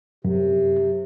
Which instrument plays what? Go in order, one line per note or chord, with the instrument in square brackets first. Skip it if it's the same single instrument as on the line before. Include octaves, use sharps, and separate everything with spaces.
[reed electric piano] F#2 [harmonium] C3